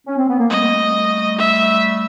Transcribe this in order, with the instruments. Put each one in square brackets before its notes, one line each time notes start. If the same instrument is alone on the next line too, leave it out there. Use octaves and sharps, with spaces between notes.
[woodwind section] C#4
C4
B3
A#3
[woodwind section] G3 A3 [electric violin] D#5
[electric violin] E5